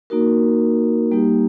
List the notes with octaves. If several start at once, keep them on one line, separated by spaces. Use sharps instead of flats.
A#3 D#4 F#4 A#4
G3 A#3 D#4 G4